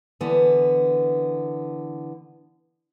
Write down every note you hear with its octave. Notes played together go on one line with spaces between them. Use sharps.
D3 E3 B3